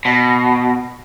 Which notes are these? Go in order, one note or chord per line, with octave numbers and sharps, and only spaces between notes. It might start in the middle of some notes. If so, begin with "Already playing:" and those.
B2